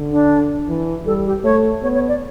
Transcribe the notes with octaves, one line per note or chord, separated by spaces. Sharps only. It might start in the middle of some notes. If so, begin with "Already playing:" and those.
Already playing: D3
D4
E3
G3 A4
G4
A3 C#5
B3 C#5
C#5
D5